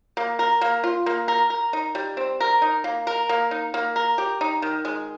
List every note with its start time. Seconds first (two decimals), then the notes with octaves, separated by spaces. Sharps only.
0.17 A#3
0.39 A#4
0.61 A#3
0.84 F4
1.06 A#3
1.28 A#4
1.50 A#4
1.73 D#4
1.95 G3
2.17 C4
2.40 A#4
2.62 D#4
2.84 A#3
3.07 A#4
3.29 A#3
3.51 D#4
3.74 A#3
3.96 A#4
4.18 G4
4.41 D#4
4.62 D#3
4.85 G#3